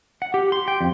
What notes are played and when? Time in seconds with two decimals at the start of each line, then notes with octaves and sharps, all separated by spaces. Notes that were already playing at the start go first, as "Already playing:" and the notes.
0.22 F#5
0.34 G4
0.52 C6
0.68 G5
0.81 F2